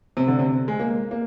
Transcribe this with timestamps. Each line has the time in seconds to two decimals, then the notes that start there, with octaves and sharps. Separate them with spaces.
0.17 C3
0.28 D3
0.39 C3
0.68 G#3
0.80 A#3
1.11 A#3